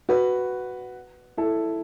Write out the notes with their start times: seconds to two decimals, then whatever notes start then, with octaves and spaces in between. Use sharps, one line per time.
0.09 F#4 B4
1.37 E4 A4